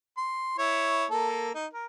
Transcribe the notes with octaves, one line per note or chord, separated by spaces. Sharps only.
C6
E4 C#5
A#3 A4
D#4
A#4